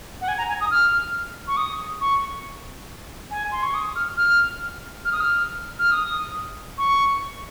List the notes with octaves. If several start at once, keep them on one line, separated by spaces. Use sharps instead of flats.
F#5
G#5
A#5
G#5
D#6
F6
C#6
D#6
C#6
G#5
C6
C#6
D#6
F6
F6
F6
D#6
F6
F6
D#6
C#6